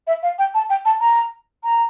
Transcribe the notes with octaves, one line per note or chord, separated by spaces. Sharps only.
E5
F5
G5
A5
G5
A5
A#5
A#5